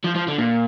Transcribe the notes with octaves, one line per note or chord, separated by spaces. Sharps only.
F3
F3
D3
A#2